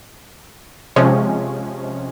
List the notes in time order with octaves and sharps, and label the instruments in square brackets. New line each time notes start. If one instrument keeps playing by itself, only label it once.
[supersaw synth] C3 F3 G#3 C#4